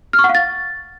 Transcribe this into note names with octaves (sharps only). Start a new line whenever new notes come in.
F6
C#6
F#5
F5
A6